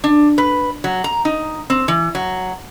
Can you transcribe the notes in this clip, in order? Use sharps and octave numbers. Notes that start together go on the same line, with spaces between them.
D4
B4
F#3
A#5
D#4
C4
E3
F#3